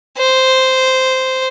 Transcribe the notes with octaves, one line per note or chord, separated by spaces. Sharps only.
C5